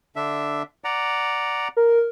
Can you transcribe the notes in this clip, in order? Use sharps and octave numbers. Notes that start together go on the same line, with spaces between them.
D3 D4 E5
D5 F#5 A#5
A#4